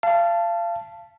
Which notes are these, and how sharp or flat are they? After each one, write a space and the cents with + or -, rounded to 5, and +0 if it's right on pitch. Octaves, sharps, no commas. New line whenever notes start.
F5 -30 A5 +0